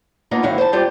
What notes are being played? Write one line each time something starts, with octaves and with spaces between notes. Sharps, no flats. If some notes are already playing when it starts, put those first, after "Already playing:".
A#3 B3 D4 D#4 F4
D2 G#2 D#3 F#3 E4 F5
C5 A5
G3 C4 F4 G4 C5 D5